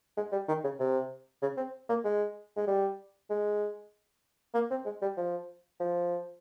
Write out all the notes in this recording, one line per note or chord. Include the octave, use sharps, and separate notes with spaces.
G#3
G3
D#3
C#3
C3
C#3
C4
A#3
G#3
G#3
G3
G#3
A#3
C4
G#3
G3
F3
F3